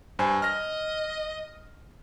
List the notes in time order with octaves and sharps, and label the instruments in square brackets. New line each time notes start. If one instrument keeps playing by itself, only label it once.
[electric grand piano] G2 C5 G#5
[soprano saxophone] D#5 [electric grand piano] F6 A#6